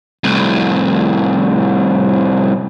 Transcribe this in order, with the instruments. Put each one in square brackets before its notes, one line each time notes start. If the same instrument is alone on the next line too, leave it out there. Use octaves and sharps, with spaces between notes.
[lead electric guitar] C2 A2